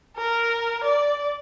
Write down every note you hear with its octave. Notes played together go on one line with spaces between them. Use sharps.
A#4
D5